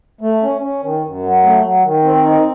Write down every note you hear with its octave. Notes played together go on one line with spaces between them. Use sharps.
A3
C#4
C#4
D#3
F#2
F#3
A3
F#3
D#3
C4
D#4